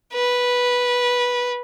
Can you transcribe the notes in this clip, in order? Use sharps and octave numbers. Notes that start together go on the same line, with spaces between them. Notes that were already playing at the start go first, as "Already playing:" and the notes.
B4